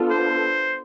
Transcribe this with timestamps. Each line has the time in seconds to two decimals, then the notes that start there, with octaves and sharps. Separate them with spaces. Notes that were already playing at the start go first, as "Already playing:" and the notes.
Already playing: B3 D4 F4 A4
0.11 C5